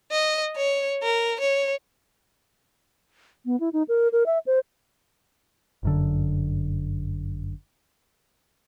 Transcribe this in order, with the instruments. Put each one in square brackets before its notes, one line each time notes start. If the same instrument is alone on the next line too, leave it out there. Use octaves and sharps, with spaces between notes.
[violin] D#5
C#5
A#4
C#5
[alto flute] B3
E4
D#4
A#4
A#4
E5
C5
[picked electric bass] G1 F#2 D3